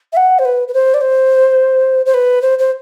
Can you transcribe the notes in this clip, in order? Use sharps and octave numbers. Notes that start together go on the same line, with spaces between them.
E5
F#5
C5
B4
B4
C5
D5
C5
C5
B4
C5
C5